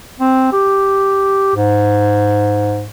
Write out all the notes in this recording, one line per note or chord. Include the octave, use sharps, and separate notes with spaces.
C4
G4
G#2